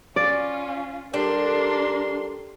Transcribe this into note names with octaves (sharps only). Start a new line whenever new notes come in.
C#4 F4 D5
G3 D4 A4 A#4 C6